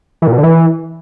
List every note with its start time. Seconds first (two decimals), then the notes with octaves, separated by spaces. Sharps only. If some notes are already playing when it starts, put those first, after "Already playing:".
0.22 E3
0.27 A#2
0.33 B2
0.38 D3
0.43 E3